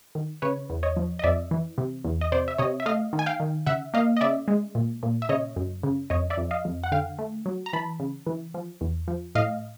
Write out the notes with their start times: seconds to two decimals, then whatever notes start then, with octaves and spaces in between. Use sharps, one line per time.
0.15 D#3
0.42 C#3 B4 C#5
0.70 E2
0.83 C#5 D#5
0.97 F3
1.19 D#5
1.24 F2 D5 E5
1.51 E3
1.78 C3
2.05 E2
2.21 D#5
2.32 C3 C5 D5
2.48 E5
2.58 C3 C#5 D#5
2.80 E5
2.86 A3 D#5 F5
3.13 D#3
3.19 G#5
3.26 F5 G5
3.40 D#3
3.66 C#3 E5 F#5
3.94 A#3 D#5 F5
4.17 D#5
4.21 C#3 D5 E5
4.48 G#3
4.75 A#2
5.03 A#2
5.22 E5
5.29 C#3 C#5 D#5
5.56 F#2
5.83 C#3
6.10 F2 C#5 D#5
6.30 D5 E5
6.38 F2
6.51 D#5 F5
6.65 F2
6.84 F#5
6.92 D3 F5 G5
7.19 A3
7.46 F#3
7.66 A#5
7.73 E3 A5 B5
8.00 C#3
8.27 E3
8.54 F3
8.81 E2
9.08 F3
9.35 A2 D#5 F5